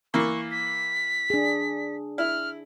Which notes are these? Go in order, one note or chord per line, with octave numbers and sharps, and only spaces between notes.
E3 A#3 C#6
B6
D4 G#4
E4 F6